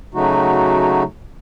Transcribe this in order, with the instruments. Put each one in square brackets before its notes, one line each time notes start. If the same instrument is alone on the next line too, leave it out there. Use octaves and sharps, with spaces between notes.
[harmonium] C#3 F#3 A3 D#4 F#4